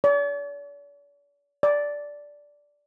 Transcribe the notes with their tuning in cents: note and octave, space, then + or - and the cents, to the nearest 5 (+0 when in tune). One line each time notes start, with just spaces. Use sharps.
D5 -45
D5 -10